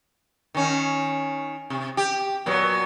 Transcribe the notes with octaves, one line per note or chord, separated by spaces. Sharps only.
D#3 C#4
C3
G4
A#2 F#3 B3